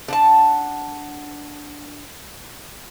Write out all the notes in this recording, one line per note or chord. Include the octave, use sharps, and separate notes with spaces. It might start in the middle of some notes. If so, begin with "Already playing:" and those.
D4 F#5 A5